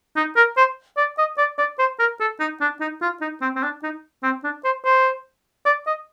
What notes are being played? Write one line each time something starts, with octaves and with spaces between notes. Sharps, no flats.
D#4
A#4
C5
D5
D#5
D5
D5
C5
A#4
A4
D#4
D4
D#4
F4
D#4
C4
C4
D4
D#4
C4
D4
C5
C5
D5
D#5